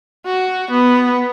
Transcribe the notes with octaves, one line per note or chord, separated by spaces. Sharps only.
F#4
B3